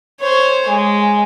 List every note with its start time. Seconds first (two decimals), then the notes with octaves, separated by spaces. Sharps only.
0.20 C5 C#5
0.68 G#3